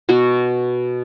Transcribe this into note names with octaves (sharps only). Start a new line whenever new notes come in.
B2 B3 F#4